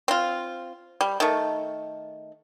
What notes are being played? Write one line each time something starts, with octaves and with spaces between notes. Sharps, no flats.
C4 F4
G3
D#3 A3